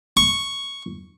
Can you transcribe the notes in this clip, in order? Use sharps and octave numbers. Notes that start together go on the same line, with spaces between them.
C#6